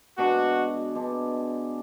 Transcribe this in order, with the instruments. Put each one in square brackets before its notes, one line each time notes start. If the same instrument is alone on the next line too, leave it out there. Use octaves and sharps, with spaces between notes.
[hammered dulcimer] B2 G#3 D4 [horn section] F#4
[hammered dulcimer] B2 G#3 D4